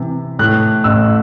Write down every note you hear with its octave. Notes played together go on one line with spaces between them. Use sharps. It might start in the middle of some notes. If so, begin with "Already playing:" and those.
Already playing: C3 E3
A2 F#6
A1 E6